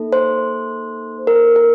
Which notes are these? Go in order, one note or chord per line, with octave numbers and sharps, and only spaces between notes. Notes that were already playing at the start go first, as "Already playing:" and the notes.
Already playing: A#3 D#4 A4
C5
A#4
A#4